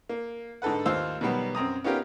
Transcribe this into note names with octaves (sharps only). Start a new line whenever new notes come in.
A#3
G#2 D3 A4 B4 F#5
D#2 F4 C5 F5 C6 E6
B2 D#3 F#3 G3 B3
F#2 C4 A#5 D#6
B3 C#4 D#4 F4 G4 A#4